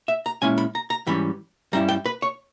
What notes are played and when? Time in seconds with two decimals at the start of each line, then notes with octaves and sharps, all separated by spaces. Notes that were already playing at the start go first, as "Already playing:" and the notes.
0.08 E5
0.26 A#5
0.42 A#2 G#3 C#4 E4 G#5
0.58 B5
0.75 A#5
0.90 A#5
1.07 G#2 E3 G3 C#4 B5
1.73 G2 G3 C#4 E4 A#5
1.89 G5
2.06 B4
2.22 C#5